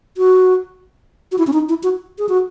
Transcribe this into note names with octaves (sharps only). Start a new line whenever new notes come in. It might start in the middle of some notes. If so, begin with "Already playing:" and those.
F#4
F#4
E4
C#4
D#4
E4
F#4
G#4
F#4